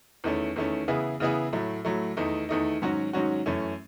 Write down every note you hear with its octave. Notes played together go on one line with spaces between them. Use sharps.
E2 D#3 A3 C#4
E2 D#3 A3 C#4
C#3 E3 B3 E4 G#4
C#3 E3 B3 E4 G#4
A2 F#3 A3
A2 F#3 A3
E2 D#3 A3 D#4
E2 D#3 A3 D#4
G#2 D#3 F#3 C#4 F#4
G#2 D#3 F#3 C#4 F#4
F#2 E3 A3 C#4